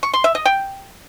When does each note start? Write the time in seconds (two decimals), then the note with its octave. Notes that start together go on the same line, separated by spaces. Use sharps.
0.03 C#6
0.13 C6
0.24 E5
0.35 D#5
0.45 G5